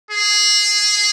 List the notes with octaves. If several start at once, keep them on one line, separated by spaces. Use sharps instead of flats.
G#4